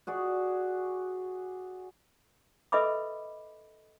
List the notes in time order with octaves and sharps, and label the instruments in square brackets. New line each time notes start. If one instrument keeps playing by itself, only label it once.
[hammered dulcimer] F#4 G#4 D5
[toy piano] A4 B4 D#5 E5 B5 D6